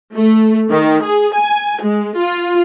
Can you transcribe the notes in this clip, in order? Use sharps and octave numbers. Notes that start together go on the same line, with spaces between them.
A3
D#3
G#4
G#5
G#3
F4